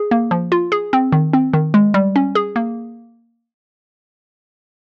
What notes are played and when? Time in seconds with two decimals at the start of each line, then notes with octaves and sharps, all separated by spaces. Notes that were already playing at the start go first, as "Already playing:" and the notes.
Already playing: G#4
0.11 A#3
0.31 F3
0.52 F4
0.72 G#4
0.93 C4
1.12 D#3
1.33 C4
1.54 D#3
1.74 G#3
1.94 G3
2.16 C#4
2.35 G#4
2.56 A#3